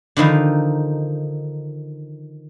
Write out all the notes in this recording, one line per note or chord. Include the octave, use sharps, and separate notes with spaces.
D3 D#3 F3 D#4